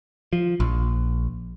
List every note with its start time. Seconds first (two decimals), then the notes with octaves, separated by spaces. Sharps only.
0.33 F3
0.60 A#1